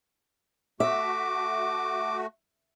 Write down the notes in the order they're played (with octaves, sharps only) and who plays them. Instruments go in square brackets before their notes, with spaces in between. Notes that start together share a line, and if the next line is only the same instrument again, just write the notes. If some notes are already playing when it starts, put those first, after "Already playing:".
[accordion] A3 F#4 [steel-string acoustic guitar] E5 [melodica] D6